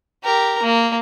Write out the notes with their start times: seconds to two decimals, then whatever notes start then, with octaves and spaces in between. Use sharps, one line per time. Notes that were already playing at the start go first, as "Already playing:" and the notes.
0.24 G4 A#4
0.62 A#3